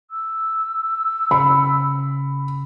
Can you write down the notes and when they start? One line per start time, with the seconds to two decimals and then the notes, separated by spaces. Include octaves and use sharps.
0.11 E6
1.31 C#3 B5